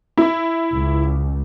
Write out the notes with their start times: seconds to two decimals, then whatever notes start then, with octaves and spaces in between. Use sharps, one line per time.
0.18 E4
0.73 C#2